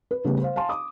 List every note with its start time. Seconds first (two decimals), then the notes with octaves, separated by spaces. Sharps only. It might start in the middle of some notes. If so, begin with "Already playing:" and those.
0.11 B4
0.25 C#3 G3 A3 B3
0.41 C5 F5
0.56 F5 G#5 A5 C6
0.69 D6 D#6